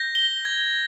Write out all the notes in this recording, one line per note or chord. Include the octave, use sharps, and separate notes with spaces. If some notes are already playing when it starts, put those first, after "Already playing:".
Already playing: G6 A#6
G7
G#6